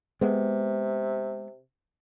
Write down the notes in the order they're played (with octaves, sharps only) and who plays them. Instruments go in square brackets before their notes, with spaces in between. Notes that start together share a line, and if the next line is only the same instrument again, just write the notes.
[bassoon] C3 [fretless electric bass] G#3 B3